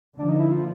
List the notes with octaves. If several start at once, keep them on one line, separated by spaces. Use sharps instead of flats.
D3 F3 A#3 D4
D#4
E4
F4